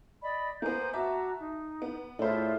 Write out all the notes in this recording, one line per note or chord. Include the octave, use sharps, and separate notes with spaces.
D5 D#5 B5
A#3 B3 C5 G#5 G6
F#4 E5 A5 A#5 D6
D#4
B3
A2 D4 E4 F4 G#4 C5 E5